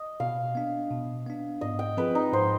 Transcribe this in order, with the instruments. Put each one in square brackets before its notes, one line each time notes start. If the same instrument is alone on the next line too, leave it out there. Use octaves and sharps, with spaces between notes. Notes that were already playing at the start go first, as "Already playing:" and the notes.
Already playing: [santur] D#5
[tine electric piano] B2 [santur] F5
[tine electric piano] B3 D4
B2
B3 D4
[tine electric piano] G#2 [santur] D#5
[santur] G5
[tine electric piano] F3 C4 F4 G#4 [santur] B4
[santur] D#4
[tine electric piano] G#2 [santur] C5